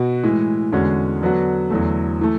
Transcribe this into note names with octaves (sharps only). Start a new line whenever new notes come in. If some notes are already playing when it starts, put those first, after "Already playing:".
Already playing: B2 F#4
A2 E3 G#3
E2 D3 G#3 C#4 F#4
D3 F#3 B3 D4 F#4
E2 D3 F#3 A3
E3 A3